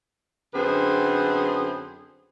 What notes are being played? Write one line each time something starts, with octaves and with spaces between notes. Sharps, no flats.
F#2 D3 C4 G#4 B4 C5